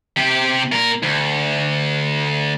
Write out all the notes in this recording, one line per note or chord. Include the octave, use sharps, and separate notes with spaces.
C3 G4
A#2 A#4
D2